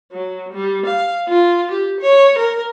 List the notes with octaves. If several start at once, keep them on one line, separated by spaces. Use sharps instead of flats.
F#3
G3
F5
F4
G4
C#5
A#4